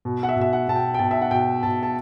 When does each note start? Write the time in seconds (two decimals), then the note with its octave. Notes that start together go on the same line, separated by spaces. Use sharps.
0.05 B2
0.23 F#5
0.29 E5
0.36 B2
0.41 E5
0.53 F#5
0.68 B2 A5
0.76 G5
0.94 G5
0.99 B2 A5
1.11 E5
1.21 F#5
1.31 B2 G5
1.63 B2 A5
1.83 A5